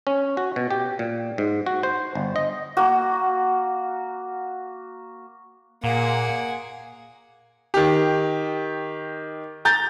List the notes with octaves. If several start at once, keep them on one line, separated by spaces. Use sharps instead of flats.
C#4
F#4
B2
G4
A#2
G#2
F#4
C5
G1
D#5
A#3 F#4
A#2 A#3 G#4 F#5
D#3 G4
A#5 G6 A6